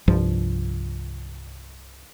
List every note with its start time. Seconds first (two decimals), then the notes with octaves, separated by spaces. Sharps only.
0.08 C2 G2 F3